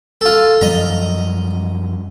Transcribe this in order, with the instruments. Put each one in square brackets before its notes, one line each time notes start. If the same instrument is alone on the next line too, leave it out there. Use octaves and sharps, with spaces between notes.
[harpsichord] F4 A4
[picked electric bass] F#2 F3 G3 [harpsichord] D#5 A#5